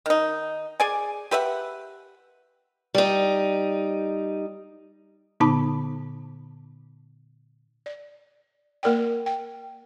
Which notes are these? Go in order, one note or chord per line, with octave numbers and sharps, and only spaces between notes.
D#3 D#4
G#4 D5 G#5
G4 B4 E5 F#5
G3 D#4
A#2 D3 B3 D#4 A5 B5
D5
A#3 A#4 D5 G5
G5